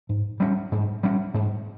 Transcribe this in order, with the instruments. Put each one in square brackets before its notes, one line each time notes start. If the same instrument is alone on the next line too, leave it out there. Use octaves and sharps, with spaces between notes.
[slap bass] G#2
G3 C#4
G#2
G3 C#4
G#2